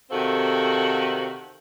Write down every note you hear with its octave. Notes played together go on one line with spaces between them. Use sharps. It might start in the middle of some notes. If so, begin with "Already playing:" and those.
C3 D#3 C4 F#4 A4 F5